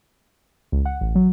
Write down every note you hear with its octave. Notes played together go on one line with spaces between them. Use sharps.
C#2
F#5
A1
F#3